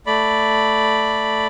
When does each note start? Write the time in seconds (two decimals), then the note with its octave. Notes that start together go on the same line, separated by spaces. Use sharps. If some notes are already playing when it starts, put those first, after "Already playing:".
0.07 A3 D5 B5